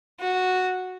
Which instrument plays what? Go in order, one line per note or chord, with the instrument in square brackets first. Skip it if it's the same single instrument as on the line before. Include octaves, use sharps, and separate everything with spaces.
[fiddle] F#4